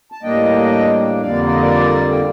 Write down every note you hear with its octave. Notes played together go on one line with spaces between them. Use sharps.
A5
A2 G3 A#3 D4 D#5 G5
F2 D3 G3 A#3 D5 F5
D5
D#5
A#4 D5
G5